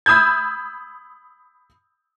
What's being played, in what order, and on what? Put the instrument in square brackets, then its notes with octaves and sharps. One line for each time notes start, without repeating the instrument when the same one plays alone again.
[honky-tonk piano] B5 D#6 E6 G6 G#6